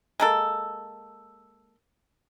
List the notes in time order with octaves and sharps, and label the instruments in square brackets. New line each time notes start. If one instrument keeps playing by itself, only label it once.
[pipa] G#3 A#3 A4